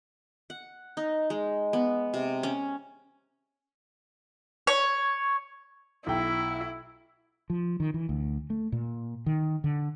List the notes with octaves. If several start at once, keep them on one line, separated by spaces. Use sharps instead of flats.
F#5
D#4
G#3
B3
C3
C#4
C#5
B1 E4 G5
F3
D#3
E3
D2
A3
A#2
D#3
D3